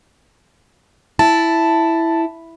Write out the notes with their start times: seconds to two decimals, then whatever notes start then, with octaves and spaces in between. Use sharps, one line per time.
1.19 E4 A5